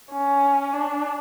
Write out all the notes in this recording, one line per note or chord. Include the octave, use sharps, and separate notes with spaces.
C#4
D4